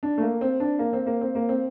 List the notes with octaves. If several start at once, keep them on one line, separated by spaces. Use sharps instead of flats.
D4
A3
A#3
C4
D4
A#3
C4
A#3
C4
A#3
C4